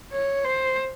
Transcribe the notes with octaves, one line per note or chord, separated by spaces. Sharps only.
C#5
C5